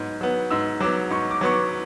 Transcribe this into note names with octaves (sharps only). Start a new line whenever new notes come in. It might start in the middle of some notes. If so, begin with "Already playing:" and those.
Already playing: G#2 F#3 B3
F#3 B3
G#2 E6
F#3 B3 D6
G#2 C#6
D6
F#3 B3 C#6
D6